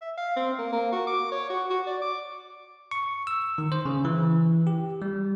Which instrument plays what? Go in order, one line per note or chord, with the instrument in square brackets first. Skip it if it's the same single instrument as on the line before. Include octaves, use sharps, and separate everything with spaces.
[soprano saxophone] E5
F5
C4
A#3
A#3
F#4
D6
C#5
F#4
F#4
D5
D6
[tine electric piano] C#6
E6
D#3
C5
C#3
E3
G4
G3